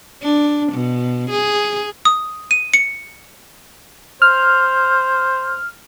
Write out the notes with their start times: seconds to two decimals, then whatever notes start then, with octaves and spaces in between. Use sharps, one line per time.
0.22 D4
0.72 B2
1.31 G#4
2.05 D#6
2.51 D#7
2.74 C#7
4.22 C5 F6